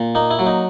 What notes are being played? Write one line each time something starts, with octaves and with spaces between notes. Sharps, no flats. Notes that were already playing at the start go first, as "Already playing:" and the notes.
Already playing: A#2
A#3 D#4
E4
F#3
D#4